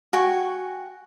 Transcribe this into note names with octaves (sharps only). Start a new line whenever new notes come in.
F#4 G5 G#5 C#6